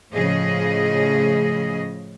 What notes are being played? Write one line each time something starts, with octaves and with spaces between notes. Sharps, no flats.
A2 C#3 F3 G#4 D#5